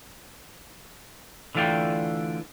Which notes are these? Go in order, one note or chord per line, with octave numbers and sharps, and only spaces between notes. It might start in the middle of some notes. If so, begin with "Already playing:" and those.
D3 E3 A3 F4 D5 G5